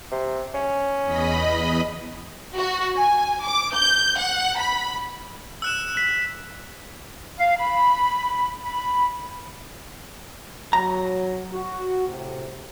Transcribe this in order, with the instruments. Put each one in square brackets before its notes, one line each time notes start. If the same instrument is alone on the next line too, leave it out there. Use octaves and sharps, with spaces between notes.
[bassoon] C3
C#4
[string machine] E2 D#5 B5
[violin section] F#4
G#5
D6
G6
F#5
B5
[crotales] E6 F#6 E7
[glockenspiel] B6
[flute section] F5
B5
B5
[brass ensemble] F#3 [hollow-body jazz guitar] A#5
[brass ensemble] F#4
A2 C3